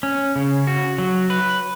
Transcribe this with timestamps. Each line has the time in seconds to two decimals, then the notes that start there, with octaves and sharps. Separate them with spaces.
0.03 C#4
0.36 C#3
0.67 F#4
0.98 F#3
1.30 B4